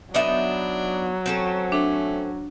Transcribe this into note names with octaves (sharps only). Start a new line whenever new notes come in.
F#3 B3 D4 D#4 E5
C4 C#4 A4
A3 D4